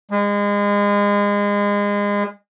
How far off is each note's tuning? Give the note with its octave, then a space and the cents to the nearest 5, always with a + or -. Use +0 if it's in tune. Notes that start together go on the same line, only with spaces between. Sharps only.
G#3 -30